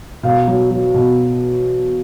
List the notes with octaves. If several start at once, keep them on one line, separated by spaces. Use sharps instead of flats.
B2 F5
F#3
F#3
B2